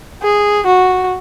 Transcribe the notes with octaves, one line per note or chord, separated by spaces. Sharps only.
G#4
F#4